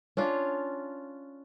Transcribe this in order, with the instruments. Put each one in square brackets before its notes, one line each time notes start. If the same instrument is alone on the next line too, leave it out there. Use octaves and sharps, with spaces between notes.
[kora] C#4 D4 F4